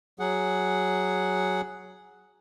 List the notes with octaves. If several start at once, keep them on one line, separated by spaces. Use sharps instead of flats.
F#3 G#4 F#5